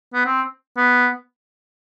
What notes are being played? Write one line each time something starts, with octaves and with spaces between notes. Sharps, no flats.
B3
C4
B3